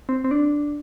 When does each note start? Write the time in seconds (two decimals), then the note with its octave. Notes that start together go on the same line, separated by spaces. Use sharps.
0.09 C4
0.24 C4
0.31 D4